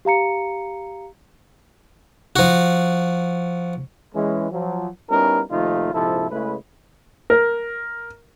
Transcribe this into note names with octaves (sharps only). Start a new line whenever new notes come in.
G4 F5 A#5 C#7
F3 F#4
E3 G#3 C#4
F3 F#3
G3 B3 C#4 D#4 E4 A#4
D#2 C3 F3 A3 D#4 F4
A#1 G#2 C3 F3 E4 A4
C#3 G#3 A3 E4 B4
A#4